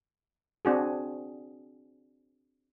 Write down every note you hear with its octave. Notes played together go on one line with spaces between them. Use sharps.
C4 D4 F#4 G#4